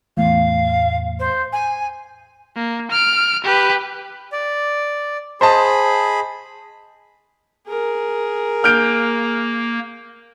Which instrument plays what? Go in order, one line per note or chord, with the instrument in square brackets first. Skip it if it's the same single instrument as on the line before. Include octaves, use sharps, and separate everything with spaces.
[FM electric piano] E2 A2 [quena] F5
[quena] C5
G#5
[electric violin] A#3
F6 D7
G4 B4
[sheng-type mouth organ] D5
[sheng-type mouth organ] G#4 B5 [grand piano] C5 D#5 A5
[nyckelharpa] G#4 A#4
[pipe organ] A#3 [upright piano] F6 G6 D7